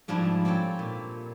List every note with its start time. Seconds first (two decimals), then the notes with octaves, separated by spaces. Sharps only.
0.08 G#2 F3 G3 D4 E4
0.45 C4 G4 A4 C#5 G5
0.79 A#2